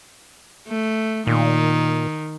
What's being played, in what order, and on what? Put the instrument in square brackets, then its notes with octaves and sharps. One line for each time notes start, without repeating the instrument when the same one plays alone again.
[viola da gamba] A3
[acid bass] A#2 [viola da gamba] D#3